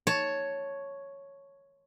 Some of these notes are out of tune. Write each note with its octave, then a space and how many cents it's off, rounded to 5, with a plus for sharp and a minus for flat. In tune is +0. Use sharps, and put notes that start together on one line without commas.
C#5 +0 A5 +0